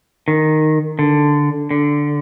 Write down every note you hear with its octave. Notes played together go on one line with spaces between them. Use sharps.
D#3
D3
D3